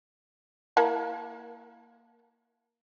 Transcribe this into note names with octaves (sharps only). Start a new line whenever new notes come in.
A#3 E4 A5